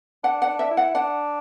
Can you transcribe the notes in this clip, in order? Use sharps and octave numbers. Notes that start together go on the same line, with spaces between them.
D4 F#5
F#5
D4
E5
E4
F#5
D4 F#5